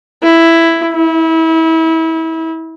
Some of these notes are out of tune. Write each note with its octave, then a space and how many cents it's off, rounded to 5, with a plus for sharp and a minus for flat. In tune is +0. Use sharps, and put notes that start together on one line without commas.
E4 +5
E4 -30